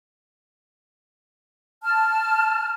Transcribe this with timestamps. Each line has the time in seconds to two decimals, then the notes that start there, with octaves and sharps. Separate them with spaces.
1.83 A5 F6